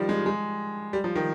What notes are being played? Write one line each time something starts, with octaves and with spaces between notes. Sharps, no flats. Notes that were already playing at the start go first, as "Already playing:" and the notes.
Already playing: D#3 F3 G3
G#3
G#3
G3
F3
D#3